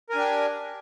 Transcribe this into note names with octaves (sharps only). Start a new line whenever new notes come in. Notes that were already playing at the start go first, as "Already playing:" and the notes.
D4 G4 A#4 G#5